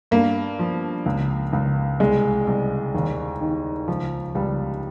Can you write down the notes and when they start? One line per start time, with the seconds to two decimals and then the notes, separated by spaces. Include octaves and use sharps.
0.11 G2 A#3
0.59 F3
1.06 C#2
1.53 C#2
2.00 C2 G#3
2.47 C2
2.95 D#2
3.41 D#3
3.88 C#2 F3
4.35 C#2 G3